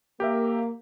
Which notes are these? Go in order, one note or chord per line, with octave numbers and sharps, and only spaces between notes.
A#3 G4 A#4 E5